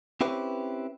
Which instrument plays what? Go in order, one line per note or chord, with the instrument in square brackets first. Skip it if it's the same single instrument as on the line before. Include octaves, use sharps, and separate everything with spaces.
[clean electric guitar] C4 C#4 E4 G4 B4 C5